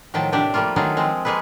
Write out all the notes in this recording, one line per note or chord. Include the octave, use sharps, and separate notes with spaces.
A2 D#3 F3 F#3 G5 A5
C3 D4 G4 D5 E5 G5
F3 G3 A3 A#3 F4
D#3 F#3 A3 F4 F#4 G#4
F3 G#3 C4
G#3 A#3 G#4 A4 B4